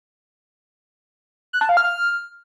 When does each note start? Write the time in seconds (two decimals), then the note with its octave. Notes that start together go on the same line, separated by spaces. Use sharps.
1.53 F#6
1.61 A5
1.69 F5
1.77 F6